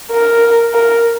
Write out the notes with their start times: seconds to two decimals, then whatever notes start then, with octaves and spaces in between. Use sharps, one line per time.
0.11 A#4
0.74 A#4